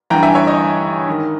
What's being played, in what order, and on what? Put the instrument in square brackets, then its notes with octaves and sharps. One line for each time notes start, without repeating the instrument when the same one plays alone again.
[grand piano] G2 E3 G5 A#5
E5 G#5
C#5 E5
D#5
G#2 D#3